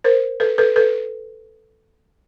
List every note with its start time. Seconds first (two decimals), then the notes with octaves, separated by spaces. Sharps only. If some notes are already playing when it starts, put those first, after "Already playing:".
0.04 A#4 C5
0.40 A4 B4
0.58 A4 B4
0.76 A4 B4